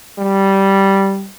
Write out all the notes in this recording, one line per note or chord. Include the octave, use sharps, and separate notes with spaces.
G3